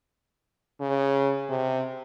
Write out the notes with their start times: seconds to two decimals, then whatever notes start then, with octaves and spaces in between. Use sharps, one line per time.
0.80 C#3
1.50 C3